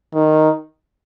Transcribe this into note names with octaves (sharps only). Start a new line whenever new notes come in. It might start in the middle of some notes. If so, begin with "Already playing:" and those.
D#3